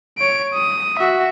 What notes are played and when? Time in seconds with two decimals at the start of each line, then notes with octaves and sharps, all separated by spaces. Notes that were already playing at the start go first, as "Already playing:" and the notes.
0.18 C#5 D7
0.53 D#6
0.99 F#4 E5